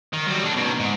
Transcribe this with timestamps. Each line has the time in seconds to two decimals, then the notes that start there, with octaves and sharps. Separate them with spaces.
0.13 D#3
0.28 F#3 G3
0.44 A2 D4
0.57 B2 D#3
0.80 G#2